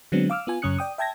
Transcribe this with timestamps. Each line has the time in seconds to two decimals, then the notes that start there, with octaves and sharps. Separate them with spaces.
0.12 D3 F#3 G#3 B3 C4 D4
0.30 F5 D6 E6 F6
0.47 B3 F4 G#5
0.62 F#2 C#3 C#4 D#6 F#6 C#7
0.78 D5 G5 D#6
0.98 E5 G5 A5 G#6 A#6